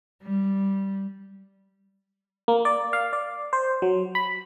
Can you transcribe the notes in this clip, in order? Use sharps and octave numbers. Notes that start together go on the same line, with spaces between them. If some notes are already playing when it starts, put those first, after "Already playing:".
G3
A#3
D5
F5
D5
C5
F#3
B5